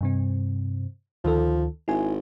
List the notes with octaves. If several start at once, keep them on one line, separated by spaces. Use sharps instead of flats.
G2 C3 C4
D2 D#3 F3 A4
G#1 E4 G#5